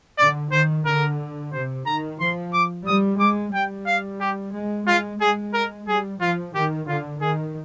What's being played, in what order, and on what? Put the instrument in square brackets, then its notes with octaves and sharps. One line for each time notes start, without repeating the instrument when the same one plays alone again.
[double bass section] D3 [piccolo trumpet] D5
[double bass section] D#3 [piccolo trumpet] C5
[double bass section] D3 [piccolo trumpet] A#4
[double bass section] C3 [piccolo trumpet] C5
[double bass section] D#3 [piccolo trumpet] A#5
[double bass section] F3 [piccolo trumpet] C6
[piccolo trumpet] D6
[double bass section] G3 [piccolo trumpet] D#6
[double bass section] G#3 [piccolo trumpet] D6
[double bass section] G3 [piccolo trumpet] G5
[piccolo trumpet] F5
G4
[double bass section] G#3
[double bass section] G#3 [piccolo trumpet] F4
[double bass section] G#3 [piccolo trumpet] G#4
[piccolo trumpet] A#4
[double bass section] G3 [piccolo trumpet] G#4
[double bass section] F3 [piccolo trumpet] F4
[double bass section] D#3 [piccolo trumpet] G4
[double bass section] D3 [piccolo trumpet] F4
[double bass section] D#3 [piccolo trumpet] G#4